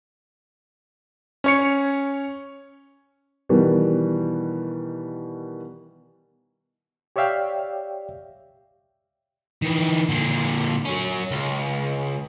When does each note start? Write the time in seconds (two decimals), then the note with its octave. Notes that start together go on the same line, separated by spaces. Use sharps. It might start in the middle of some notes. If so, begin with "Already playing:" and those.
1.44 C#4 C#5 C#7
3.49 B2 D#3 E3 G3
7.16 G4 C#5 D5 E5 F5 G5
9.62 D#3 E3
10.09 A#2 D3
10.85 F#3 C#4
11.31 C#2